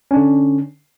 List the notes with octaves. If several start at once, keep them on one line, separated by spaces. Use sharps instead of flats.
D3 C#4 D4